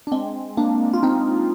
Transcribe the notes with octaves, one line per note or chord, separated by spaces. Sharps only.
D4
G#3 C4
A#3 D4
F4
C4 D#4